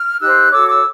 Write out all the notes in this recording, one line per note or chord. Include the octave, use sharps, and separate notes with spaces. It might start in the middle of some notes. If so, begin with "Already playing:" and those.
Already playing: F6
D#4 G4 C5 E6 F#6
F#4 A4 C#5 D6 E6
D6 E6